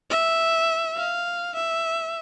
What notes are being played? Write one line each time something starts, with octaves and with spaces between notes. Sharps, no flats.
E5
F5
E5